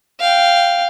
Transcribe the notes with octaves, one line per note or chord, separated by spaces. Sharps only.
F5 G5